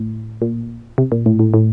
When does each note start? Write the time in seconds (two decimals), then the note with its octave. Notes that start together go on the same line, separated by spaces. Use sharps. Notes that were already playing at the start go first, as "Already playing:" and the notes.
Already playing: A2
0.42 A#2
0.98 C3
1.12 A#2
1.26 A2
1.39 A2
1.54 A2